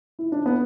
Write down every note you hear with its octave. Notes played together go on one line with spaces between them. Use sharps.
E4
D4
B3